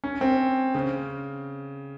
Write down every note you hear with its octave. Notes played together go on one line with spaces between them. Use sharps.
C#4
C4
C#3